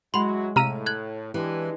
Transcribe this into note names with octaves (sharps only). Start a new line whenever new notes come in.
F#3 G#3 E4 F#4 F#5 B5 C6
A2 C3 F5 A#5 E6 F6 D#7
F#6 G#6 F#7
E3 G#3 D4 G4